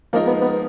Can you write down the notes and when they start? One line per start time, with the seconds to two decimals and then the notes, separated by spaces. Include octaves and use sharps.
0.13 F3 G#3 A#3 D#4 A#4
0.27 B3
0.41 B3